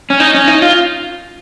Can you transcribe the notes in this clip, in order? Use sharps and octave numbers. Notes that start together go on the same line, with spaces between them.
C#4
D#4
C#4
D#4
F4